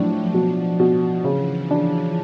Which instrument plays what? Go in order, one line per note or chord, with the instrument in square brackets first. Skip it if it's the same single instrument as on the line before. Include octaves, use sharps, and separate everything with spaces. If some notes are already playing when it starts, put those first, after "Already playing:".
Already playing: [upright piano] A2 D4 [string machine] F3 F#3
[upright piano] B2
B2
[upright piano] C#3 [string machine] E3
[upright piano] D4